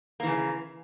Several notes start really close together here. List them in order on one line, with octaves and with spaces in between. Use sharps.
A#3 E3 C#3